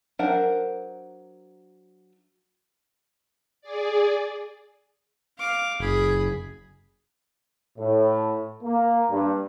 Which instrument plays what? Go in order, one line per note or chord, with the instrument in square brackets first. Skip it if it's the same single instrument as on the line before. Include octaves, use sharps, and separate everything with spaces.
[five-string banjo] F#3 D4 A#4 C5 F#5
[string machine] G#4 D5
[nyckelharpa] F5 D6
[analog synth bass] F#1 [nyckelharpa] G#4 B5
[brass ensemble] A2
A#3
G2